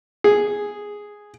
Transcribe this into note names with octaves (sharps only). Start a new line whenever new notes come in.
G#4